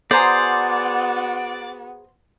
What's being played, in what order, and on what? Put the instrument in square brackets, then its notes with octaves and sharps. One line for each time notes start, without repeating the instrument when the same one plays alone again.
[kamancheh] B3 F#4 [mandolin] G#4 A#5 C6 [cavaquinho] C5 [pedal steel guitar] D5